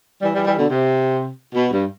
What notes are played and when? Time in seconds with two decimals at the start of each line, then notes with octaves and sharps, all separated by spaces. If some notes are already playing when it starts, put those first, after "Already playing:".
0.22 E3 G3
0.34 E3 G3
0.47 E3 G3
0.58 B2 D3
0.70 C3
1.55 B2
1.73 G2